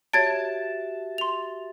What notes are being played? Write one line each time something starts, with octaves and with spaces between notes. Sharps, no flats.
F#4 G4 C#5 E5 A5 G#6 D7
C6 F7